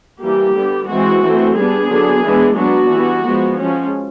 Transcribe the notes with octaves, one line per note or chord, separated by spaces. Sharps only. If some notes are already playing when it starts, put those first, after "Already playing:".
E3 G3 A#3 G4
D3 G3 B3
E3 G#3 C4 F#4
E3 A3 C4
G3 B3 D4 G#4
D3 F#3 B3 D4
E3 G#3 B3 D4
F#3 B3 D4 F#4
E3 G3 B3
F3 G#3 B3
F3 G#3 C#4